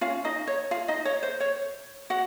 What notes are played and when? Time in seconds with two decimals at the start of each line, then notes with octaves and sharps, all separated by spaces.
0.01 C#4 F4 F5
0.25 D#4 D#5
0.47 C#5
0.71 F4 F5
0.88 D#4 D#5
1.05 C#5
1.23 C5
1.40 C#5
2.10 F#4 F#5